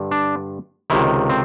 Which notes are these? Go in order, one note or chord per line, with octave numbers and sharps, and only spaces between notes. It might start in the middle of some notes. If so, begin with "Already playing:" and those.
Already playing: G2 D3
D4
C#2 C3 D#3 E4
C4